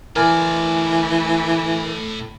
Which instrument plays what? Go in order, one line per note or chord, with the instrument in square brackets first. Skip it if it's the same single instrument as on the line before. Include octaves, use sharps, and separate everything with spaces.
[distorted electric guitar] A2 D5 [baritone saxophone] E3 [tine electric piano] A#4 G#5